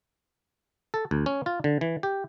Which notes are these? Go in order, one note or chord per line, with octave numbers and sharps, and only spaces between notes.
A4
D2
C#4
F4
D3
E3
G4